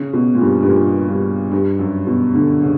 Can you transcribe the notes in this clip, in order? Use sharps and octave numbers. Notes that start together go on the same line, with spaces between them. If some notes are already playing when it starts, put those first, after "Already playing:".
Already playing: C#3
B2
A#2
G2
G2
A#2
G2
G2
F#2
B2
D3
C#3